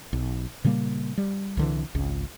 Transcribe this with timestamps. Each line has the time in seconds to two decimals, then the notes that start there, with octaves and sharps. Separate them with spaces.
0.13 B1
0.64 A#2 C#3 G3 A#3
1.18 G3
1.57 C2 D3 E3
1.95 G#1 C#2